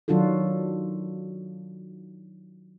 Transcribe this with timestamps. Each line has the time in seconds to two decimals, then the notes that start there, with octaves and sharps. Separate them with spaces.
0.08 D#3 F#3 D4 F4 F#4 A4